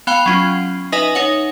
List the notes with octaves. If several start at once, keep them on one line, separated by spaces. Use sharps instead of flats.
B3 F5 G5 B5
F#3 C#4 F4
D#4 B4 D#5 E5 G#5
D#4 C#5 F#5